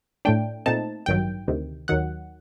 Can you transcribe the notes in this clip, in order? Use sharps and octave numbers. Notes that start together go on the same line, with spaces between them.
A2 A3 D4 G5
A#2 A3 C4 D#4 A5
A1 G2 D#3 F#3 G5
D2 C3 D#3
D#2 D#3 F#3 F#5